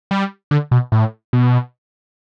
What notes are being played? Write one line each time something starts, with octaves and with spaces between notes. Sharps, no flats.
G3
D3
B2
A2
B2